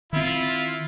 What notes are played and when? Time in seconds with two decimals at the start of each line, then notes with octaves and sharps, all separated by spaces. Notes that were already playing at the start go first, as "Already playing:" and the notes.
0.13 D#3 C4 E4 F4